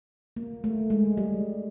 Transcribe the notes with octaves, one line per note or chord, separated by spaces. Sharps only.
A#3
A3
G#3
G3